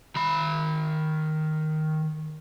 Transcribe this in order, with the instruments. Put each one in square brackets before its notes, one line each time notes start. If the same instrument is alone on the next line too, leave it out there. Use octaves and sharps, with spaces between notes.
[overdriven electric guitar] D#3 B5